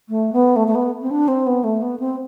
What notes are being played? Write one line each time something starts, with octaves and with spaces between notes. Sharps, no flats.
A3
B3
A3
A3
B3
C4
D4
C4
B3
A3
B3
C4